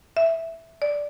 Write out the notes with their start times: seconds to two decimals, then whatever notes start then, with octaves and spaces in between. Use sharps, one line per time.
0.17 E5
0.82 D5